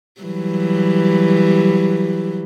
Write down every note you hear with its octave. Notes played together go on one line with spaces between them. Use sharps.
E3 F#3 G3